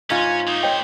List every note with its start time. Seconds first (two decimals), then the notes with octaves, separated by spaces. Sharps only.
0.10 G#2 C#4 F4 G#5
0.48 A#3 D#4 C5
0.63 C#5 D#5 G5